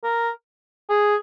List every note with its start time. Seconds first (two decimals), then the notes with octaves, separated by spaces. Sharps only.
0.04 A#4
0.90 G#4